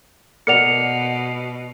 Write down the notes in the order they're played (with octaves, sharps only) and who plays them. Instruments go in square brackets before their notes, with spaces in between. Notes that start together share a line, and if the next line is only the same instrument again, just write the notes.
[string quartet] B2 [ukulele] A#4 D5 F#5 [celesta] C#7 F7